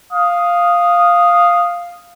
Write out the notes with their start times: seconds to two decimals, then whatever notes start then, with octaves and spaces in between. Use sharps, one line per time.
0.13 F5 D#6